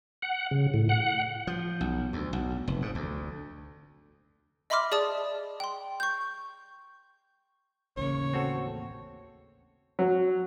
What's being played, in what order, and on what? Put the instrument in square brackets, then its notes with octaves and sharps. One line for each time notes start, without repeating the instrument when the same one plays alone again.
[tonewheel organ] F#5
C#3
A2
F#5
[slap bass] F3
B1
D2
B1
F1
G#2
D2
[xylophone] D#5 E5 B5 C6 D6 F6
G#4 D5 A5 D#6
G5 C6
C#6 G6
[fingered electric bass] A1 D#2 A#3 [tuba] C#3 [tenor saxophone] C#5
[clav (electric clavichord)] C4 F#4 A4
[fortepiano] F#3